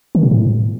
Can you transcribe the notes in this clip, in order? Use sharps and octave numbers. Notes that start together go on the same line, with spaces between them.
D#3
B2
A2